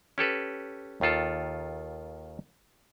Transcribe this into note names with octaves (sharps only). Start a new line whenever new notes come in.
C#4 G4 A4 B4
D#2 D#3 F4 A4 F5